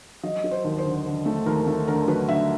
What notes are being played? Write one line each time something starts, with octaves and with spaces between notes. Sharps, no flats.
F#3 D#5
F#3
C5
D#2
C5
D3
D3
A3
D#2 A#4
A3
D3 A#4
F#3 B4
D3 E5